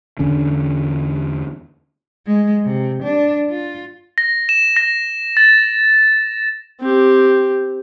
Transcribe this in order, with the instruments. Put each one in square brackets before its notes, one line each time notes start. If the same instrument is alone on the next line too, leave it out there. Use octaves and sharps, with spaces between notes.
[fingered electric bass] E2 D3 C#4 D4
[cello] G#3
C3
D4
F4
[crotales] A#6
E7
A#6
A6
[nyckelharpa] C4 G4